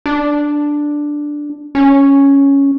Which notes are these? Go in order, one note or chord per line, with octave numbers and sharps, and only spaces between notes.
D4
C#4